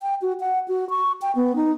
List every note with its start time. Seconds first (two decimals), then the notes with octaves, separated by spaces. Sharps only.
0.02 G5
0.22 F#4
0.40 F#5
0.68 F#4
0.90 C#6
1.22 G5
1.36 B3
1.56 D#4